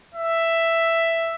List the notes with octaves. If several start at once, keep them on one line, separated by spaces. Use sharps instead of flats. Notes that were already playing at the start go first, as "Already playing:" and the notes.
E5